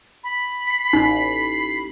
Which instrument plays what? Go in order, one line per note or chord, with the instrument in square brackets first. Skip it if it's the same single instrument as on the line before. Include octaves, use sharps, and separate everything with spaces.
[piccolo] B5
[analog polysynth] B6 C7
[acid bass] A1 [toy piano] D#4